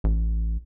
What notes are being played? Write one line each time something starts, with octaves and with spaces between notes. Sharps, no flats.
A1